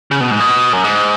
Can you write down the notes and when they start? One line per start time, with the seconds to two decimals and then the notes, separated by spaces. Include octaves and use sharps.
0.11 C#3
0.21 B2
0.31 G#2
0.40 B2
0.73 F#2
0.84 G#2